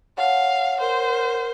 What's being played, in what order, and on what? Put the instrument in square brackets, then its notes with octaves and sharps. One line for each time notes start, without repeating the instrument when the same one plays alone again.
[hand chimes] C#5 F#5 A5 [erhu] F5
[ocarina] A#4 [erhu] C5